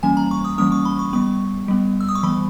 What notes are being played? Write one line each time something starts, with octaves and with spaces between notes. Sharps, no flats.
E3 G3 A#3 C#4 G#5
A#5
C#6
D#6
E3 G3 A#3 C#4 D#6
C#6
B5
C#6
G3 B3 C#6
G3 B3
E6
D#6
C#6
E3 G3 B3 B5